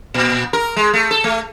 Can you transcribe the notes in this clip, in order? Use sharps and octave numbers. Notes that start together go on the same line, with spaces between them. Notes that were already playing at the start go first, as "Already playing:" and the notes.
A#2
A#4
G#3
A3
A4
A3